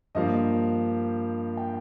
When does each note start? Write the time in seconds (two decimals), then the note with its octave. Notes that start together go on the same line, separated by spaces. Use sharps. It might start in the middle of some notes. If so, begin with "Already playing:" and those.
0.15 G2 F3 A#3 D#5
1.57 G5